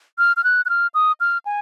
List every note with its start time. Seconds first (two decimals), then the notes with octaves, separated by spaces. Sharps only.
0.18 F6
0.37 F6
0.44 F#6
0.65 F#6
0.69 F6
0.94 D#6
1.20 F6
1.46 G#5